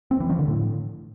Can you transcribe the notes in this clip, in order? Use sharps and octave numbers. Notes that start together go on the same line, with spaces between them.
C4
E3
F3
D3
A2